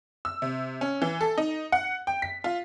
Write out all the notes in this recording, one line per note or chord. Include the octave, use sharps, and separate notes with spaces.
E6
C3
C#4
E3
A4
D#4
F#5
G5
B6
F4